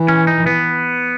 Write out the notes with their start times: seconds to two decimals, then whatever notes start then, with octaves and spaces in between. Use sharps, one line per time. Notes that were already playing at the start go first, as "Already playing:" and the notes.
Already playing: E3
0.08 C#4
0.27 D#4
0.46 B3